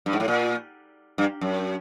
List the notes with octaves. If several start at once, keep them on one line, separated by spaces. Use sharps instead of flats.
G2
G#2
A2
A#2
G2
F#2